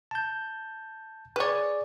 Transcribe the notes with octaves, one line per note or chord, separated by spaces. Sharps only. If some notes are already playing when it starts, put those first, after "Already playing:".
A5 G6
G#4 B4 C#5 D5